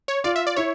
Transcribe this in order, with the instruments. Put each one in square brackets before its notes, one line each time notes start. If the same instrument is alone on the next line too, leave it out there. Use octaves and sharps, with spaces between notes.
[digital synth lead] C#5
[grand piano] F4 [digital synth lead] D5
[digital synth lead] E5
D5
[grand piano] E4 [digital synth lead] C#5